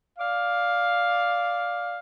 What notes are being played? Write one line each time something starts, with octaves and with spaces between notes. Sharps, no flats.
D5 F5